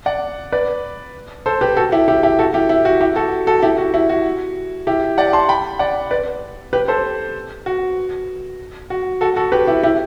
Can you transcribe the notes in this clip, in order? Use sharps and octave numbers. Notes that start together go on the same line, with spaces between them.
D5 F#5
B4 D5
A4 C5
G4 B4
F#4 A4
E4 G4
E4 G4
E4 G4
F#4 A4
E4 G4
E4
F#4
E4 G4
F#4 A4
F#4 A4
E4 G4
F#4
E4
F#4
E4 G4
D5 F#5
A5 C6
G5 B5
D5 F#5
B4 D5
G4 B4
A4 C5
F#4
F#4
F#4 A4
F#4 A4
G4 B4
E4 G4
E4 G4